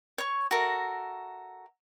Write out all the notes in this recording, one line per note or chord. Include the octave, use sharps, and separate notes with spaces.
C#5 C#6
F#4 A4 A#4 E5